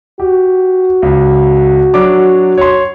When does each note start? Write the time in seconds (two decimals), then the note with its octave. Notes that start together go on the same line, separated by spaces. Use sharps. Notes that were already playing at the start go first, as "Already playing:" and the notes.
0.20 F#4 G4
1.02 C#2
1.94 F#3 D4 D6
2.58 C#5 C6